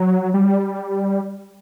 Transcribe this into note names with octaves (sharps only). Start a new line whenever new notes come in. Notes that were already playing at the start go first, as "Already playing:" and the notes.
Already playing: F#3
G3